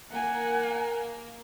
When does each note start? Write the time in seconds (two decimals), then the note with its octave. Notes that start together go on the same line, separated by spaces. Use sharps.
0.12 A#3 F#5 G#5